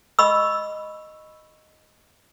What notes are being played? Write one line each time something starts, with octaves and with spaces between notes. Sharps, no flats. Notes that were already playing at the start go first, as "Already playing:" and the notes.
D#5 B5 C#6 E6